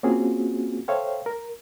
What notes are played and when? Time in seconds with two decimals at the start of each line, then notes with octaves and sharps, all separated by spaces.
0.03 A#3 C4 C#4 F4 F#4 G#4
0.88 A4 C5 C#5 E5 F5 G5
1.26 A#4